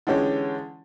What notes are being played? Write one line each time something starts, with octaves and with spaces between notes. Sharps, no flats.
D3 E3 G#3 C#4 G4